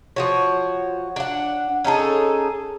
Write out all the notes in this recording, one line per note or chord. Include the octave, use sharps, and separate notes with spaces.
F3 F#4 C#5
D4 F#5
C#4 D#4 G#4 A4